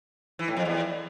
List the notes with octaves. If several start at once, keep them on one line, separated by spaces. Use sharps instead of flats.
E3
A2
F2
E2